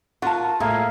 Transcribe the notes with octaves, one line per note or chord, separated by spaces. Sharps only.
F4 F#4 A#4 F5 F#5 A5
A2 A#3 G#4 E5 F5